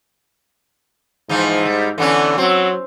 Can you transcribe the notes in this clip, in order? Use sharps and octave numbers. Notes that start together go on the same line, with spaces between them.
G#2 E3 F3 D#4
G3
D3 E3 B3 C#4
F#3 C4